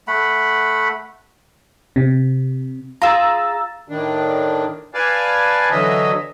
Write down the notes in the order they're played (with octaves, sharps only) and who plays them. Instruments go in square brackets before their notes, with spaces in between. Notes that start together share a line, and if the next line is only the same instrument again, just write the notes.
[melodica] A3 F#5 B5
[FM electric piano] C3
[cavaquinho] F4 G#4 [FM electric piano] A#5 E6 A6
[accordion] A2 D#3 D4
B4 D5 F5 G#5 A5
D3 E3 F#3 D#5 E5